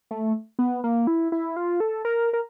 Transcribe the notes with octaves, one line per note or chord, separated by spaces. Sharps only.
A3
B3
A#3
E4
E4
F4
A4
A#4
A#4